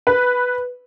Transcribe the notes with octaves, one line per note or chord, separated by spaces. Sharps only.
B4